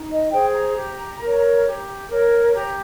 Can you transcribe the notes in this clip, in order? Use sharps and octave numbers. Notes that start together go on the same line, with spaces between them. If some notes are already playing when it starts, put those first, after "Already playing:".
Already playing: D#4
D#5
G#4 C5 G5
A#5
G4
A#4 C#5
G4
A#4 C#5
G4 A#5